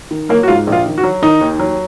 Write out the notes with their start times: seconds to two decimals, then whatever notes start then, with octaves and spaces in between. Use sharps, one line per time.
0.11 D#3
0.29 F#3 A#3
0.43 F#4
0.48 G#2 F4
0.67 A#1
0.72 F4
0.86 D#3
0.98 F#4
1.04 F#3
1.22 D#3 D#4
1.41 D#2
1.60 F#3